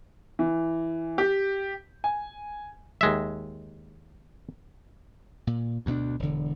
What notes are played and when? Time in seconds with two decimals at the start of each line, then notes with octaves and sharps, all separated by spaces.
0.39 E3
1.18 G4
2.04 G#5
3.01 D#2 G#3 E5
5.47 A#2
5.86 D2 B2 G#3 D4
6.19 E1 D3